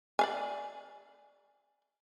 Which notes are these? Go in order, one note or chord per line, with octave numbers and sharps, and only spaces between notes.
D5 F5 G#5